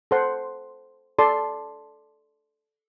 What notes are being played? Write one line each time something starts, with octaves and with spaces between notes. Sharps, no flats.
A4 C5 F#5 C6
A4 D5 A5 C6